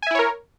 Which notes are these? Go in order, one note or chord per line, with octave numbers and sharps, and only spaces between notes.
E4 A#4 C#5 E5 G#5